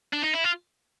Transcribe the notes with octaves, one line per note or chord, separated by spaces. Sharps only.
D4
D#4
E4
F4